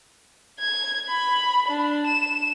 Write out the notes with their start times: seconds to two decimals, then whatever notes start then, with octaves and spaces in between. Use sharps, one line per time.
0.59 G#6
1.09 B5
1.68 D4
2.07 E7